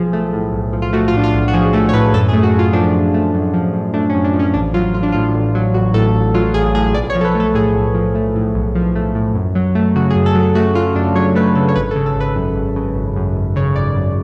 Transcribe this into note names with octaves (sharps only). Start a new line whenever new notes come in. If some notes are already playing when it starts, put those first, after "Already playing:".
Already playing: B1 F3 G#4
A3
A2
B1
F3
F4
A3 F#4
F4
A2 D4
F4
B1
F#4
F3 G#4
A3 A4
C#5
A2 B4
F#2 A4
G#4
A3
F#4
F#2 F4
F3 D4
F#2
A3
F#2
F3
F#2
A3 D4
C#4
F#2
D4
F3
C#4
A1 D4
F#3 F4
A1 F4
D4
A2 F4
A1
F#3
A1 F#4
A2 A4
A1
F#3 F4
A1 G#4
A2 G#4
B1 D5
C#5
F3
A4
B4
A3
A4
A2 G#4
B1
F3
A3
A2
B1
F3
A3
A2
F#2
F#3
A3
C#3 F#4
G#4
F#2
A4
F#3
A3 F#4
C#3 F4
F#2 D4
F#3 C#5
A3 B4
C#3 A4
C#5
G#1 B4
A4
C#3
A4
G#1 B4
F#2
G#1
C#3
G#1
F#2
G#1
C#3 C#5
G#1 D5
F#2